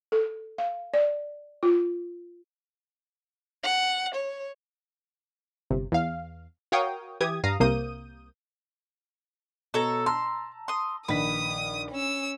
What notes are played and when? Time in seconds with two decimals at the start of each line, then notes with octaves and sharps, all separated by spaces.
0.12 A4
0.58 F5
0.94 D5
1.63 F4
3.64 F#5
4.14 C#5
5.70 G1 C3
5.92 E2 F5
6.72 F#4 A#4 C#5 F5 G5 D#6
7.21 E3 G4 D#6 G#6
7.44 G2 F5 A#5 D#6
7.60 C2 C3 A#3 D#6 G6 D#7
9.74 B2 A4 C#5 A#5
10.06 A5 A#5 C6 E6
10.68 C6 D#6
11.08 A#1 D#3 B4 D#6 B6
11.91 C#4 E6